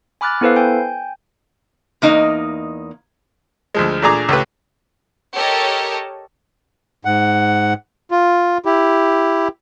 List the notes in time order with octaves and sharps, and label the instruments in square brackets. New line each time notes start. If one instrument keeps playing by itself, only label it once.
[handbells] G#5 B5 D6 F6 F#6 A6
B3 E4 A4 B4 C5 F5
G5 G#5 G6
[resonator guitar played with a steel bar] E2 A#3 D#4 D#5
[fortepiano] D2 F3 G#3
A#2 A3 D4 G#4 A#5 D6
C#2 A3 G4 B4
[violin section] G4 A4 A#4 C#5 D#5 A5
[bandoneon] G#2 F#5
F4
E4 G4